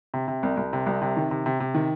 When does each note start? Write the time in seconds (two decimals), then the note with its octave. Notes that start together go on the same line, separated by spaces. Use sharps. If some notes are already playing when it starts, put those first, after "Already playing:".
0.14 C3
0.28 C3
0.43 C2
0.57 C2
0.73 C3
0.87 C2
1.02 C3
1.17 D#3
1.31 C3
1.46 C3
1.60 C3
1.75 D#3